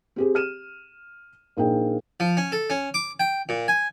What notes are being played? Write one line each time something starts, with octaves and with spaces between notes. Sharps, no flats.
C4 G4 G#4
F6 D#7 E7
A#1 A#3 D#4 G#4 G5
F3
C#4
A4
C#4
D6
G5
A#2
G#5